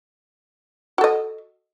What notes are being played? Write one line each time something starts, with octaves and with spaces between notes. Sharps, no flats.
F#4 A4 D#5